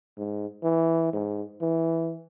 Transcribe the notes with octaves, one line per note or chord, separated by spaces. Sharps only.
G#2
E3
G#2
E3